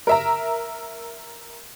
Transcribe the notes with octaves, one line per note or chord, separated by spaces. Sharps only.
A#4 E5 A#5